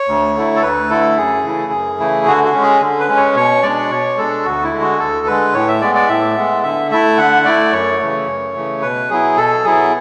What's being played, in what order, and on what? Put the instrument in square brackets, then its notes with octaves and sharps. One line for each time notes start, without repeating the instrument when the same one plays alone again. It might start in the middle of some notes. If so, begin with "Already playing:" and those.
Already playing: [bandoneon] C#5
D2
D3 A3 E4
A4
D2 B4
D3 A3 E4 A4
F#2 G#4
C#3 E3 A3 E4
F#2
C#3 E3 A3 E4
D3 F#4
F#4
G#3 C#4
G#4
D3
B4
G#3 C#4
C#5
B2 C#5
G#3 D4 D5
B2 C#5
G#3 D4 A4
D2 F#4
E4
D3 G#3
F#4
D2 A4
D3 G#3 B4
A2 C#5
E5
G#3 B3 D5
D5
A2 E5
G#3 B3
D3 E5
A3 E4 E5
D3 F#5
A3 E4 D5
F#2 C#5
C#3 E3 A3
F#2
C#3 E3 A3
B2 B4
F#3 B3 E4 G#4
B2 A4
F#3 B3 E4 G#4